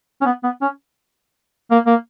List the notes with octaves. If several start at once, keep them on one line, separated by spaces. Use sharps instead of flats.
C#4
B3
B3
C#4
A#3
A#3